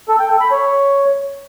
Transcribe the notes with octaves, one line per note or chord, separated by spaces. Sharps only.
A4
G5
A4
B5
C#5